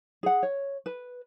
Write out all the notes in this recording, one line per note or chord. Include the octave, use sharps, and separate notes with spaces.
G#4 F#5
C#5
B4